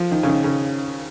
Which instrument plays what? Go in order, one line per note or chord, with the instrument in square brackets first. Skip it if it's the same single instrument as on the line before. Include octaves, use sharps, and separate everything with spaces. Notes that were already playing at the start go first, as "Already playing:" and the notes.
Already playing: [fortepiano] F3
D#3
C#3
D#3
C#3